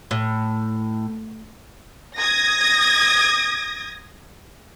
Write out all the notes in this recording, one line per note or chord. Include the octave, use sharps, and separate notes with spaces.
A2
D#6 G#6 A#6